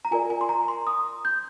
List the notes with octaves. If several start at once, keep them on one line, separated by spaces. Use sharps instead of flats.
A#5
F4 A#4 D5 G#5
G#5
C6
A#5
C6
D#6
G6